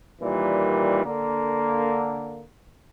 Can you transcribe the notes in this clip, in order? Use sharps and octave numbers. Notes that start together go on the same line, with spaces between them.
A#2 D#3 E3 G3
D3 A#3